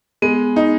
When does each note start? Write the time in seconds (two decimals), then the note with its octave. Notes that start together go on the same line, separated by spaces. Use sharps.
0.22 G#3 B3
0.56 D#4